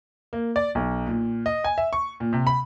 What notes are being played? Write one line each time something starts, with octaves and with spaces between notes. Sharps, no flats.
A#3
D5
B1
A#2
D#5
G#5
E5
C#6
A#2
C3
B5